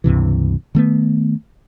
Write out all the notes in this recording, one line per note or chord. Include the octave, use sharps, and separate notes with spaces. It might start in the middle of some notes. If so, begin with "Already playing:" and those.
C#2 G2 C3 E3
D#3 A3 B3